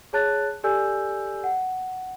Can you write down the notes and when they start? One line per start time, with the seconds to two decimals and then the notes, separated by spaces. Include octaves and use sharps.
0.13 G#4 C#5 A5 F#6 A6
0.64 G4 A4 D5 G#5 E6 G6
1.44 F#5